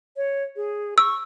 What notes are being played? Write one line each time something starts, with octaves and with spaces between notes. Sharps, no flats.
C#5
G#4
C#6 E6